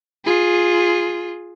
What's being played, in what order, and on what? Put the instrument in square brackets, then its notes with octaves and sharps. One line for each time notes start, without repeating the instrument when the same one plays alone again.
[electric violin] F4 G#4